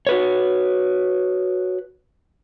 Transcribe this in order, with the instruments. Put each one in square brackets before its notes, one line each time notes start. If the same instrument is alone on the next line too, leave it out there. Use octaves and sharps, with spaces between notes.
[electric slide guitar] F#4 B4 C#5